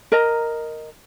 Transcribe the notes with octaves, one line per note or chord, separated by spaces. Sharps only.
A#4 D#5 A#5